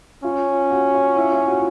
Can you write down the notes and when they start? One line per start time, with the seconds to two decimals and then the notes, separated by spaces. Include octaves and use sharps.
0.24 C#4 F4
0.71 F#4
0.94 F4
1.16 E4
1.32 F4
1.47 F#4